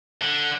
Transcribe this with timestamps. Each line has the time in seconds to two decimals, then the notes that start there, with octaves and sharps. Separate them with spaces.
0.22 D3